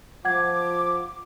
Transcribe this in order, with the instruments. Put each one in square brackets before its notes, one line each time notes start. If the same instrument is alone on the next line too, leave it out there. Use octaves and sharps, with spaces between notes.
[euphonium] F3 [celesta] F#5 G#6 [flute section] D6